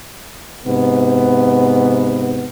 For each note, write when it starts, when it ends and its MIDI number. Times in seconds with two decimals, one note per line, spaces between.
0.66 2.49 44
0.66 2.49 48
0.66 2.49 59